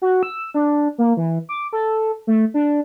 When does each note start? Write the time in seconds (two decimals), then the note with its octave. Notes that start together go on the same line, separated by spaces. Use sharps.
0.02 F#4
0.23 E6
0.54 D4
0.98 A#3
1.17 E3
1.49 D6
1.73 A4
2.27 A3
2.54 D4